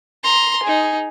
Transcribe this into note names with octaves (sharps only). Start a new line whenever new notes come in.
A#5 C6
D#4 G#4